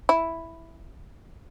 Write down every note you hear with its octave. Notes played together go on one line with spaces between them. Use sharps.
E4